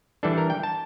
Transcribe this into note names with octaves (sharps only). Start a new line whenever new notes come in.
E3 G3 D4 A4
A#4
G5
A5